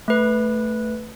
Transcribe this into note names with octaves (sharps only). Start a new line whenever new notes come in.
A3 B4